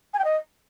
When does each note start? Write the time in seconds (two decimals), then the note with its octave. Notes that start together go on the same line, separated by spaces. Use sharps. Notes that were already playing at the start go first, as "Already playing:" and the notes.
0.13 G#5
0.19 G5
0.24 D#5